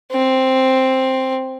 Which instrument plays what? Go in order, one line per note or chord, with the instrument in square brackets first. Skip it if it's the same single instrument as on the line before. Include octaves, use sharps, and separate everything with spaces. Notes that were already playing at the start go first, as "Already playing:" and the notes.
[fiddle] C4